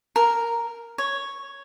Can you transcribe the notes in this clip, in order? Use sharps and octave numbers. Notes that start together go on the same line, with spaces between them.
A#4
C#5